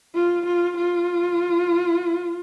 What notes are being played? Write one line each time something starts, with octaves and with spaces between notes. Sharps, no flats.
F4
F4
F4